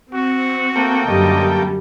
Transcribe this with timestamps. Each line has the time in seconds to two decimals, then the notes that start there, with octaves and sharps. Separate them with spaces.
0.13 C4 F#4
0.76 A3 A#3 G5
1.06 F#2 D3 G3 D#5